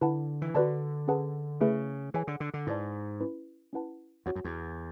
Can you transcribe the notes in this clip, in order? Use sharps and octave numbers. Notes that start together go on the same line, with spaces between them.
D3 E4 B4 F#5 A5
E3
D3 F#4 B4 D5 A5
C#4 G#4 B4 F#5 A5
C#3 A3 E4 G#4 B4 E5
E3 G#4 C#5 G#5
D3
D3
D3
G#2 E4 B4 D5 A5
C#4 E4 B4
C#4 E4 B4 F#5 A5
E2 F#4 C#5 F#5
F#2
E2